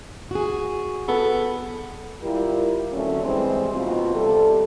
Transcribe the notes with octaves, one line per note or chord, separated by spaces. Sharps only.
F#4 G#4
B3 A4
G3 E4 F4 G4 A#4
D3 F#3 A3 C4 C#4
E3 G3 G#3 C4
D#2 B2 C4 D#4 F4
C3 G3 A4